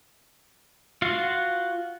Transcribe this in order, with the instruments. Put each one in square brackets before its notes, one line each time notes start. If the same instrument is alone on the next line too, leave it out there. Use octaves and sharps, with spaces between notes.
[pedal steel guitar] F4 F#4 F5